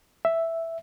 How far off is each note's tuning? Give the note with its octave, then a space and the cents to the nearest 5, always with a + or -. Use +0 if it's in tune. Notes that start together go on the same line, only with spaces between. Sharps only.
E5 +0